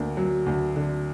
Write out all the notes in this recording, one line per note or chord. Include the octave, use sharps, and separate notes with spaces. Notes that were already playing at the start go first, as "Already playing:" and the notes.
Already playing: D2 D3 A#3
F#3
D2
D3